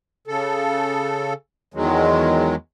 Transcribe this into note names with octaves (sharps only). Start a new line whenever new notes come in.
C#3 A4
E2 D#3 F#3 G#3